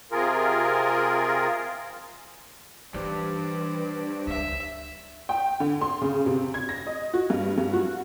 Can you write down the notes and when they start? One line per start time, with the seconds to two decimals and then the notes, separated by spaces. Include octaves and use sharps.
0.12 C3 F4 G#4 A#4
2.94 G2 E3 C5 D5
4.27 C#2 E5
5.29 G5
5.60 D3
5.81 C6
6.02 C#3
6.26 C3
6.54 G#6
6.69 A#6
6.87 D#5
7.14 F#4
7.30 G2
7.58 G2
7.73 F#4